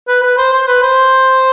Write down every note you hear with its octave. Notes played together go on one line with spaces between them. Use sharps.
B4
B4
C5
C5
B4
C5